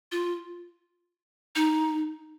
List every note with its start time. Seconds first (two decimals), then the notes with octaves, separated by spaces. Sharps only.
0.12 F4
1.56 D#4